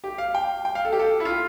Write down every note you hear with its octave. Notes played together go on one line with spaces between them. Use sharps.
G4
F5
G5
G5
F5
A4
G4
A4
E4
F4